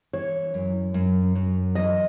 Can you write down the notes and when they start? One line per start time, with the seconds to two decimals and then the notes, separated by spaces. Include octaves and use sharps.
0.13 E3 C#5
0.54 F#2
0.94 F#2
1.35 F#2
1.75 E3 D#5